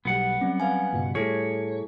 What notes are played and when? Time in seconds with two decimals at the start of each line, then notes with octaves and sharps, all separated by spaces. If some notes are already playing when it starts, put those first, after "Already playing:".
0.05 B1 G3 B3 F#5
0.41 F#3 G3 C4 C#4
0.60 B4 F5 G#5
0.93 C#2 G2 B2
1.15 A2 G3 E4 G#4 A4 C#5